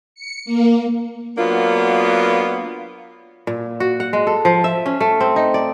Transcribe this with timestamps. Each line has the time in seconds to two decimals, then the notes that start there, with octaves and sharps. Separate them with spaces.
0.15 C#7
0.45 A#3
1.37 F#3 A#3 B3 D4 F4
3.47 A#2
3.80 F#4
4.00 F#5
4.13 G#3
4.27 A4
4.45 F3
4.64 E5
4.86 C#4
5.00 A3
5.20 C4
5.36 D#4
5.54 D5